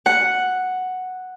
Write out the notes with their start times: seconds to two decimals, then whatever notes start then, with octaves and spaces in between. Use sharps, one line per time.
0.06 F#5